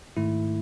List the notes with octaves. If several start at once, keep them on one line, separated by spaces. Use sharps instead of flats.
G#2 D#3 A3 E4